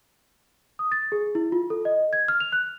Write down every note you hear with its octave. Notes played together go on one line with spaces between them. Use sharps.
D#6
A6
G#4
E4
F4
A4
D#5
G#6
F6
F7
F#6